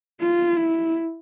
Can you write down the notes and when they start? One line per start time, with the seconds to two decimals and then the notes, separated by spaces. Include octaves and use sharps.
0.21 F4
0.57 E4